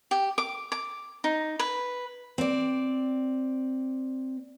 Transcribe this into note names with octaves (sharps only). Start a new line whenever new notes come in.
G4
D6
D6
D#4
B4
C4 D5